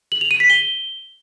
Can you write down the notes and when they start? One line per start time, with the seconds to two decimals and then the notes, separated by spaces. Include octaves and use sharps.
0.12 F#7
0.21 F7
0.31 D#7
0.40 B6
0.50 G7